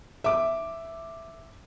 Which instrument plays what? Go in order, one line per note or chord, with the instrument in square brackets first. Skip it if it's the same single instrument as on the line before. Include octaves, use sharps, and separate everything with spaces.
[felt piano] E5 D6